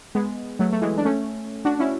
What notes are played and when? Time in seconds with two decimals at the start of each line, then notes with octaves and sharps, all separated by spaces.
0.15 G#3 B3
0.59 F#3 A3
0.73 A3
0.81 E3 G#3
0.97 D4
1.05 A3 C#4
1.65 D4 F#4
1.79 C#4 E4